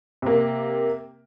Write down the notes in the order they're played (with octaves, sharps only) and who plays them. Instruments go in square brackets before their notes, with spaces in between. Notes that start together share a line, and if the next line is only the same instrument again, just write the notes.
[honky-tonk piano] C3 A#3